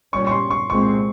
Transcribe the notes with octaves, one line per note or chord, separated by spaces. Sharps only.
A#2 G3 C#4 C#6
C#6
C6
C#6
C2 A#2 G#3 C4 C#6